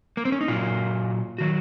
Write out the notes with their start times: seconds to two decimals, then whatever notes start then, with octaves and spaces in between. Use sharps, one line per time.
0.17 A#3
0.25 C4
0.32 C#4
0.41 D#4
0.48 A#2 F#3 F4
1.38 D#3 F#3 F#4